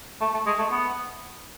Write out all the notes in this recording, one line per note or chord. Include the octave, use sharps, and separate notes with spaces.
A3
A3
G#3
A3
B3